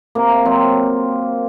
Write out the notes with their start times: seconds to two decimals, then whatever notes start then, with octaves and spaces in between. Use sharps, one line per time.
0.15 C3 A#3
0.45 F#3 C4